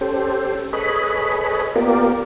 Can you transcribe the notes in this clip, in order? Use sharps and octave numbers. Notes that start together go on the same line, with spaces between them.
C#4 G4 A4 C5
G#4 A4 B4 C#5 D#5 B5
A#3 B3 F4 G4 A#4 D5